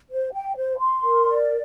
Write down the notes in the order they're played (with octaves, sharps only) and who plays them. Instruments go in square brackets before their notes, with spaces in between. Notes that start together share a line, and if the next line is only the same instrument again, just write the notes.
[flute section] C5
G5
C5
C6
A#4
D5